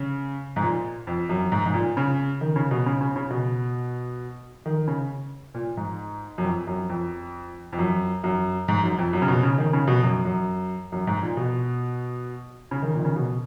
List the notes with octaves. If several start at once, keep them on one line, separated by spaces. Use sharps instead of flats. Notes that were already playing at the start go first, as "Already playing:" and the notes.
Already playing: C#3
G#2
A#2
F2
F#2
G#2
G#2
A#2
C#3
D#3
C#3
B2
C#3
C#3
C#3
B2
D#3
C#3
A#2
G#2
F#2
F2
F#2
F2
F2
F#2
F#2
G#2
F#2
F2
F#2
C#3
B2
C#3
D#3
C#3
B2
F#2
F#2
F#2
G#2
A#2
B2
C#3
D#3
A#2
D#3
C#3
B2